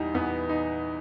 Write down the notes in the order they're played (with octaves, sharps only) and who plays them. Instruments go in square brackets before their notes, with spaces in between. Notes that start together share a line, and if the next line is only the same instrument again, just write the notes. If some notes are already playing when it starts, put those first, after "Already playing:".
Already playing: [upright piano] E2 E3 [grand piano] G3 D#4
[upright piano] E2 E3 [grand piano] B3
[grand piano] D#4